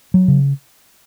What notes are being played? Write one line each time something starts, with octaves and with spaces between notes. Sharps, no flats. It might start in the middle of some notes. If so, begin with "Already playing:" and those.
F#3
C#3